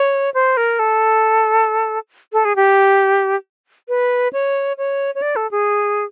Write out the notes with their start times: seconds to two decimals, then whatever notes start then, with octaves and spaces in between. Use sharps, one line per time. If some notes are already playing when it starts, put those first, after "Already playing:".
Already playing: C#5
0.34 C5
0.57 A#4
0.79 A4
2.33 A4
2.45 G#4
2.56 G4
3.88 B4
4.33 C#5
4.78 C#5
5.15 C#5
5.22 D5
5.36 A4
5.51 G#4